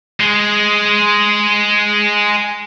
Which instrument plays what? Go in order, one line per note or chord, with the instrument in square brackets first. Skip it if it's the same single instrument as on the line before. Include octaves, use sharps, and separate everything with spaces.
[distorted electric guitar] G#3 G#4